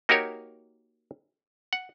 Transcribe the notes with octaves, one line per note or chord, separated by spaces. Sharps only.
A#3 D#4 F#4 G4 A#4 C#5
F#5